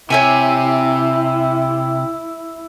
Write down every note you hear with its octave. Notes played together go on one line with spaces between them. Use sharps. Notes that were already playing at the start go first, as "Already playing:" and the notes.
C3 E4 C#5 E5 G#5